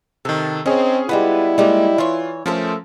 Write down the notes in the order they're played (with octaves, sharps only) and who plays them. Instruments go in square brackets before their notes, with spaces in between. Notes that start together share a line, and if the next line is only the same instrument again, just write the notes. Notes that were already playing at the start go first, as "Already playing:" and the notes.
[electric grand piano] C3 D#3 [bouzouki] A4
[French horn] C4 [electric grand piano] C#4 G#4 C#5 [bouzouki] D#4
[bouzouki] G3 G#3 B3 [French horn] E4 [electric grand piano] F4 B4
[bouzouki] G3 D#4 [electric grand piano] G#3 A#3
[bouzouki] E3 C#5 [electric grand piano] F4 C6
[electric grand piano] F3 C#4 [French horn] A3 [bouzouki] A4 A#4 C5